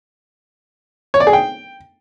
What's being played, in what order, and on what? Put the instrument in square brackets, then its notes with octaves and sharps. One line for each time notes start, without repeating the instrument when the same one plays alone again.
[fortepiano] C#5
D5
G#4
G5